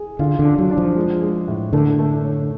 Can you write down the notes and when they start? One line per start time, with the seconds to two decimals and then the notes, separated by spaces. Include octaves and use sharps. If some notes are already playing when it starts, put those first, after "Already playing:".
Already playing: G#4
0.19 D3 F4
0.39 D3
0.45 D4
0.58 F#3
0.71 D4
0.78 F3
0.96 G#3
1.22 G#3
1.48 A2
1.73 D3 A3
1.99 A3
2.25 C#5